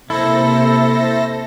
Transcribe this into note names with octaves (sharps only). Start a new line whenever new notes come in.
C3 A#3 E4 A4 C5 E5 A#6